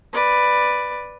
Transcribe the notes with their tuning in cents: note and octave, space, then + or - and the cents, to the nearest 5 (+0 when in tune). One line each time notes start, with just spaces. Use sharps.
B4 +0 D5 +10